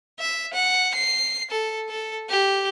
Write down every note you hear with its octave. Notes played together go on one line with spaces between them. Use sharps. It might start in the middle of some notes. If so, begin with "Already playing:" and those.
E5
F#5
C7
A4
A4
G4